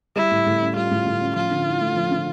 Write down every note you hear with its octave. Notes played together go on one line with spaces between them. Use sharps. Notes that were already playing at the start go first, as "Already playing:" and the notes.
G3 E4
A2
A2
C#4
G3 F4
A2
A2
C#4
F3 F4
D3
E4
A3
F3
D3